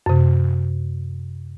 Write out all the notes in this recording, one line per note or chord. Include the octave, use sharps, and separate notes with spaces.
F#2 C3